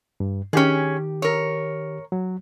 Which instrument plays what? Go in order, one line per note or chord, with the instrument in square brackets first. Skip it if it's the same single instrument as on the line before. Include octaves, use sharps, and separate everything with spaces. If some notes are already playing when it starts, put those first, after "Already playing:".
[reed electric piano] G2
[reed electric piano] D#3 G4 [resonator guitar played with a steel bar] C#4 G#4
[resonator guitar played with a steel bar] A#4 C#5
[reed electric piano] F#3